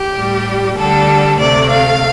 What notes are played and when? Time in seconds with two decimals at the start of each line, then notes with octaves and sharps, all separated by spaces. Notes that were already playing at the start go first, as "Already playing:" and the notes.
Already playing: G4
0.16 A2 G3
0.78 D2 D3 G3 A4
1.38 D2 C3 A3 D5
1.69 F5